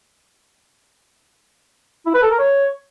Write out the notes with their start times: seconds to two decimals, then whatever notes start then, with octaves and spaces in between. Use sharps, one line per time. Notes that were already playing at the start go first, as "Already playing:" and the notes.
2.06 E4
2.14 B4
2.23 A4
2.31 A#4
2.39 C#5